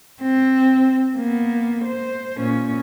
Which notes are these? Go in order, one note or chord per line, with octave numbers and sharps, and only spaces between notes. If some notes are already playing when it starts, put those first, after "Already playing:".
C4
A#3 B3
C5
A#2 C#4